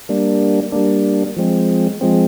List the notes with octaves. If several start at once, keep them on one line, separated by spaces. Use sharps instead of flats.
G3 A#3 D4
G3 A#3 D4
F3 G#3 C4
F3 G#3 C4